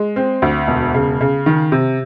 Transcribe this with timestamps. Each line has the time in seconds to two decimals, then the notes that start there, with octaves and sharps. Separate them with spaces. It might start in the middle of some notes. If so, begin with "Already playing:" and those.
Already playing: G#3
0.16 C4
0.42 D2
0.67 E1
0.94 C#3
1.21 C#3
1.46 D#3
1.72 C3